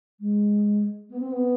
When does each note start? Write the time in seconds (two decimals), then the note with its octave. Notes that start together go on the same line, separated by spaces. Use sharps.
0.20 G#3
1.10 B3
1.20 C4
1.32 B3